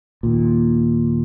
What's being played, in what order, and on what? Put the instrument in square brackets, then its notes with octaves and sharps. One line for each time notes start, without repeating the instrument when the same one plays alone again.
[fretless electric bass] D#2 A#2